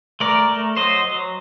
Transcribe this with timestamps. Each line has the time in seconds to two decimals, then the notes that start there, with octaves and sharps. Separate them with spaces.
0.20 A3 A#4 D5
0.49 A3
0.76 F#3 C5 D#5
1.04 F#3